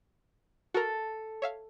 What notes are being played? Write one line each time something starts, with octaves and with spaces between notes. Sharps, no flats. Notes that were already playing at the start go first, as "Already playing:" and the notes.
F#4 A4 A#4
C#5 E5 F5